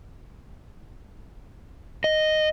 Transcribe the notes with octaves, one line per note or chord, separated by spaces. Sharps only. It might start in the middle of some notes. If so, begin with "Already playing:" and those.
D#5